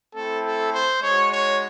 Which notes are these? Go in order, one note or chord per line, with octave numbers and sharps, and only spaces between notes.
A3 C4 E4 A4
A4
C5
G#3 D#4 F#4 C#5
C#5